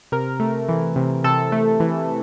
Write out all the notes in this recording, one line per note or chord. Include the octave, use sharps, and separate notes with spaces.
C3 A#4
A3
E3
C3
C3 A4
A3
E3